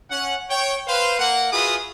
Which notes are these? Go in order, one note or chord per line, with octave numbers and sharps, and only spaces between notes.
C#4 F#5
C#5 G5
B4 C5 F5
A#3 F#5
F4 F#4 G#4 B4 E5 D#6